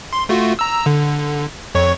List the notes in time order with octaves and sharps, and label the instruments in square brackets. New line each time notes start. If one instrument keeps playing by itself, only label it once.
[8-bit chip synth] C6
A3 F4 F#4
A#5 E6
D3
F2 C#5 C#6